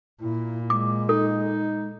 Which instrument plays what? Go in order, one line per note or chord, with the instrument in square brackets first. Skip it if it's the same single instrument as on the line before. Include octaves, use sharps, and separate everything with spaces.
[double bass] A#2 [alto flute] E4
[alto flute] G#3 [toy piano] D6
[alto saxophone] D#4 [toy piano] A4